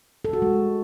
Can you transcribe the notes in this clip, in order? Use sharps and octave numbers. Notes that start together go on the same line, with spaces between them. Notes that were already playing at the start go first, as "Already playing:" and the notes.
A4
F#4
G#3